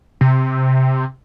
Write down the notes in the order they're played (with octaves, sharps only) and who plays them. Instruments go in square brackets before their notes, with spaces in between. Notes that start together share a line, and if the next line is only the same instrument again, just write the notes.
[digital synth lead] C3